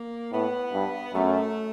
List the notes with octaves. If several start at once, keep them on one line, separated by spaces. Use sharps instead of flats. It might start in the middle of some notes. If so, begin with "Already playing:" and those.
Already playing: A#3
A2 B3
G2
F#2 A3